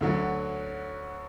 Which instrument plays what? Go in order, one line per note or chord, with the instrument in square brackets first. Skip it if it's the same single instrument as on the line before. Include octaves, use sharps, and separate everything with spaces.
[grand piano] D2 D3 F#3